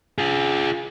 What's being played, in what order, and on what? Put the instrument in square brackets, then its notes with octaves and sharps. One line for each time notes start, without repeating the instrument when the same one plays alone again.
[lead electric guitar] F4 G#4